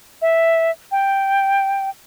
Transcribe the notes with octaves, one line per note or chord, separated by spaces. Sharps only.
E5
G5